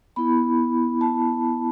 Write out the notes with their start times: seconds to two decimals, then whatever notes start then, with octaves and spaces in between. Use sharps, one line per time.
0.16 B3 E4 B5
1.01 A5